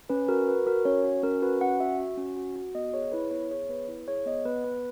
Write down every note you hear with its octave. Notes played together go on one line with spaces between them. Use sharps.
C#4 B4
F#4 A#4
F#4 B4
F#4 A#4
C#4 C#5
F#4
C#4 A#4
F#4 B4
C#4 F#5
F#4 E5
F#4
C#4
F#4
F#4
B3 D#5
G#4 C#5
E4 B4
B3 C#5
G#4 C#5
B3 B4
E4
G#4 C#5
B3 D#5
B3 B4
B3 B4